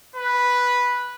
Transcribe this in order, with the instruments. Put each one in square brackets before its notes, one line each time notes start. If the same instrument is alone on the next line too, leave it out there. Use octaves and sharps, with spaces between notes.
[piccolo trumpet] B4